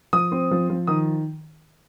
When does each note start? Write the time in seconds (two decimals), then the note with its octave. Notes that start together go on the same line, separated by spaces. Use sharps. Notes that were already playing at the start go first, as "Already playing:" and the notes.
0.13 F3 D#6
0.32 C4
0.51 F3
0.70 F3
0.87 D#3 D#6